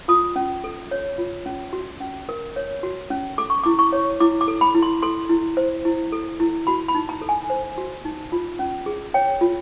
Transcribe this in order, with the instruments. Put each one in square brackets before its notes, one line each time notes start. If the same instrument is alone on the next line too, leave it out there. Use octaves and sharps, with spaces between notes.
[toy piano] F4 D#6
C#4
A4
C#5
F4
C#4
F#4
C#4
A#4
C#5
F#4
C#4
A4 D6
C#6
E4 D6
C#6
C#5
E4 D6
D6
A4
B5
E4
C6
A4 C6
E4
C5
E4
A4
E4
F#4 B5
B5
D#4
A#5
A4
G#5
C5
F#4
D#4
F4
C#4
G#4
C#5 G5
F4